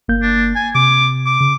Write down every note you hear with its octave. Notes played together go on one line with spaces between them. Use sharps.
G1 A#3 G6
D4
G#5
C3 D6
D6
C#3